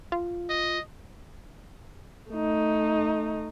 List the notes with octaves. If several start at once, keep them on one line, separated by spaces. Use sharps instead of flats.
F4
D#5
A3 D#4